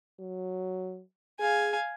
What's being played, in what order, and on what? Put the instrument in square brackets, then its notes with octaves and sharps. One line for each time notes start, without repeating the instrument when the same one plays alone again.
[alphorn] F#3
[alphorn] G#4 [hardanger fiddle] F5 G#5